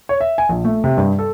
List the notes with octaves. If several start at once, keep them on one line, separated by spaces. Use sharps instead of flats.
C#5
E5
G#5
A#1
A3
C3
G2
A4